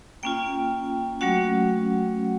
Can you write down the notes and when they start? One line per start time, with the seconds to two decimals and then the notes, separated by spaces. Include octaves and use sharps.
0.23 A#3 C#4 F4 G5
1.21 F#3 A3 C#4 F#4 F#5